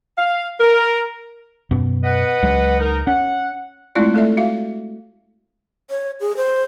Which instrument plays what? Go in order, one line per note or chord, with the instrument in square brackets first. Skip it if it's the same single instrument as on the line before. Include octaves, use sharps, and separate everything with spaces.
[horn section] F5
A#4
[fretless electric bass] F#2 B2 B3
[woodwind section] B4 D#5 F#5
[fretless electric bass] C#2 F#3 G#3
[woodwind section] D#4 A#4
[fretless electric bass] C#4 [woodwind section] F#5
[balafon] G#3 A3 C4 E4 F4 D5
A3 A4 D5 E5
F#4 E5 F5
[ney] C#5
G#4
C5